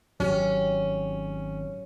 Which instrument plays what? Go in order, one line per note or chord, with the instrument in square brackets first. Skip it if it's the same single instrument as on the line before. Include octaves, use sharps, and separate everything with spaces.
[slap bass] G#1 [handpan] F#3 G4 [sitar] C#4